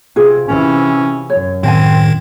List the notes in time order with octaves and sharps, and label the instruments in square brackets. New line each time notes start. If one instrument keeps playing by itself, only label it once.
[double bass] C3 [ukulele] F4 G#4
[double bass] C3 E3 [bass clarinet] C#4
[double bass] F#2 [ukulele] C#5
[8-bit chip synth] A2 D#3 [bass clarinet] C4 [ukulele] C5 G5 G#5